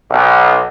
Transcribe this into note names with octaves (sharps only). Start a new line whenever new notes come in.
B1